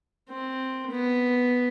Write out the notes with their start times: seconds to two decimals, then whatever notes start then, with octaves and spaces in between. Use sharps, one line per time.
0.30 C4
0.91 B3